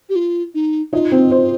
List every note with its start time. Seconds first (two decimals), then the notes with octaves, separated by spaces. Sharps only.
0.09 G4
0.16 F4
0.55 D#4
0.93 D#4 F4 D#5
1.12 C4 C5
1.31 C4 C5